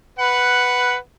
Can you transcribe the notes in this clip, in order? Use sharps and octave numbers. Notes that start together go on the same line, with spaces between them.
B4 F#5